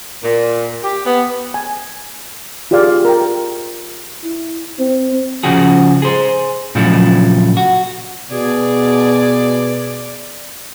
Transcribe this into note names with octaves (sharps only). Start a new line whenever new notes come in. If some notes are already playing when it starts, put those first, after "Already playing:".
A#2
G4
B3
G#5
F4 G4 G#4 D5 F5
A#4 G5
E4
C4
C#3 F3 F#4 G#4
G#4 C5
A#2 C#3 F3 F#3 A3 E4
F#4
B2 G#4 D5